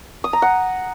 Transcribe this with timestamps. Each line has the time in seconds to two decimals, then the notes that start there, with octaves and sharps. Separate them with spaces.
0.24 D#6
0.33 A#5
0.42 F#5